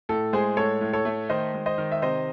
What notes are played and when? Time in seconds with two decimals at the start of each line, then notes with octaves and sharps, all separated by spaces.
0.09 A2 A4
0.33 G#3 G#4 C5
0.57 A2 A4 C#5
0.81 A2
0.93 A4 C#5
1.05 A3
1.29 D#3 C5 D#5
1.54 G#3
1.66 C5 D#5
1.78 D#3
1.92 E5
2.02 C3 C5 D#5